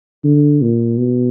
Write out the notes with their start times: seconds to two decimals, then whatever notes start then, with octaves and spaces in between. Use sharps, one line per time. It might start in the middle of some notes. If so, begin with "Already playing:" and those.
0.25 D3
0.62 A#2
0.98 B2